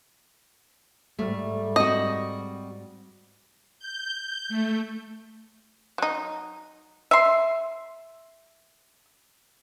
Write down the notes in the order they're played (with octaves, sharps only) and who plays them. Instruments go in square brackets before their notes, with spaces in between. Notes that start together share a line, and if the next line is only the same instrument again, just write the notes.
[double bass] G#2 G3 [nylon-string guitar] A3
[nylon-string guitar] C4 F#4 [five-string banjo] D#5
[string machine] G6
A3
[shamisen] F#3 D#4
[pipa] E5 C6